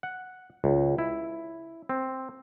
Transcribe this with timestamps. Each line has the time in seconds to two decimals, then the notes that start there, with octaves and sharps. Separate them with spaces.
0.03 F#5
0.64 C#2
0.98 E4
1.89 C4